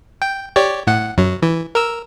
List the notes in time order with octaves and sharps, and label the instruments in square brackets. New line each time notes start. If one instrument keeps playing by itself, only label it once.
[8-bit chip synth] G5
G4 C#5 D5
A2 F#5
F#2 F#3
E3
A#4 E6